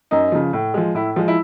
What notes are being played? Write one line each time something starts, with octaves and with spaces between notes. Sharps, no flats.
F#2 D#4
C#3 F3
A2
F3 G#3
A2 E4
F3 G#3
E4